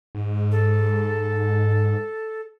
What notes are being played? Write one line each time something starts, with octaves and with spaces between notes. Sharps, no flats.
G#2
A4